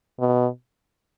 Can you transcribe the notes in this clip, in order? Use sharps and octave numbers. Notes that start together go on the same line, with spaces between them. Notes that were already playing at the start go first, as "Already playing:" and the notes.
B2